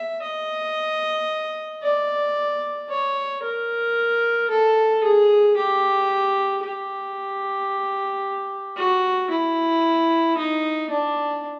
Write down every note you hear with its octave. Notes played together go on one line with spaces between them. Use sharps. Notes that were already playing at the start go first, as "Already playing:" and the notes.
Already playing: E5
D#5
D5
C#5
A#4
A4
G#4
G4
G4
F#4
E4
D#4
D4